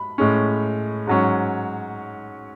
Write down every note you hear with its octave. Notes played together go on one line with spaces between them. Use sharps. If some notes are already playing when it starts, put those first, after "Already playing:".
Already playing: B5
A2 G#3 C#4
G#2 F#3 C#4